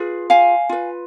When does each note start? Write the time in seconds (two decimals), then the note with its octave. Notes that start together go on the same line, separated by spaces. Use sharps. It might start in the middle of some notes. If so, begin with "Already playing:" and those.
Already playing: F4 G#4 B4
0.30 F5 G#5
0.69 F4 B4